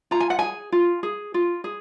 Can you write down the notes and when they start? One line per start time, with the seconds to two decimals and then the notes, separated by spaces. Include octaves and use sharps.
0.11 F4 A#5
0.20 G#5
0.30 F#5
0.39 G#4 G#5
0.72 F4
1.03 G#4
1.34 F4
1.64 G#4